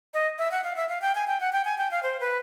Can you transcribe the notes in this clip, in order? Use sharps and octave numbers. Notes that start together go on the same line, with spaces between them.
D#5
E5
F#5
F5
E5
F5
G5
G#5
G5
F#5
G5
G#5
G5
F5
C5
B4